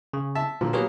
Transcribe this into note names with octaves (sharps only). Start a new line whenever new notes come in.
C#3
E5 A5
A#2 D3 F3
F#3 A#3 B3 G4 G#4 C#5